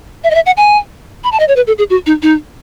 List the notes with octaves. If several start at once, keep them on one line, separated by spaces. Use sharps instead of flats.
E5
D#5
E5
F#5
G#5
B5
A5
D#5
C#5
B4
A4
G#4
F#4
D#4
D#4